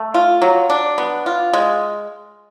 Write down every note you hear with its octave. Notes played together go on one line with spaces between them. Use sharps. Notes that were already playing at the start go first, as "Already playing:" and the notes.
Already playing: A3
F4
F#3
D4
B3
F4
G#3